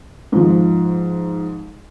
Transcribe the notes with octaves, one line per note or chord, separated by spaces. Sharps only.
G#2 F3